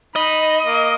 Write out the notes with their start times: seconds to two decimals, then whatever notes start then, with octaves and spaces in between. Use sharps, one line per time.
0.16 D#4 D#5 B5
0.64 A#3